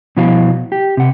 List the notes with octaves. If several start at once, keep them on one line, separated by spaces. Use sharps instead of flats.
B2 F3 E4 F#4 F5
G4
C3 F#5